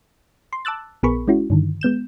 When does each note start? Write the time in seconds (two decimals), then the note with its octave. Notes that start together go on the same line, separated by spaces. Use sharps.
0.53 C6
0.65 A5 D6 E6 F#6 A6
1.03 A#1 B3 G#4 A#4 B5 C#6
1.28 G#3 C#4 E4 F#4
1.50 G2 D3 D#3
1.81 G#3 B3 G6 E7